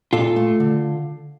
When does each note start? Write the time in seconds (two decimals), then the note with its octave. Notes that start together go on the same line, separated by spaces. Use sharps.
0.13 A#2 F4 A4
0.36 A3
0.60 D3